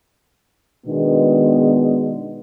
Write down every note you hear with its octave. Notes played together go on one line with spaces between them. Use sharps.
B2 D#3 G#3 B3 D4